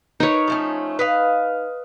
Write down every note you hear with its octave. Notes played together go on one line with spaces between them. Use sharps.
D#4 A#4 B4 C#5
F3 A3 C#4
B4 D#5 F5